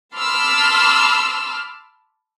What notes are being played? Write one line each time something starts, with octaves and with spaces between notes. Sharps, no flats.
A5 B5 C6 D6 E6 F6